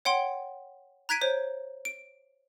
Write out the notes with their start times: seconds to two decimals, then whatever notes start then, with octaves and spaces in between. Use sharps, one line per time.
0.05 C#5 F#5 G5 C6
1.09 A#5 F#6 G#6 B6 D7 D#7
1.22 C5 C#5
1.85 D7